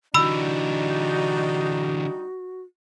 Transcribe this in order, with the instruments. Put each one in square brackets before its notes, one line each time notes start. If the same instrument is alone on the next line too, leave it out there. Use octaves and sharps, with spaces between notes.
[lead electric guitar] D3 E3 [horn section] G3 D4 D#4 [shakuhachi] F#4 [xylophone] B5 E6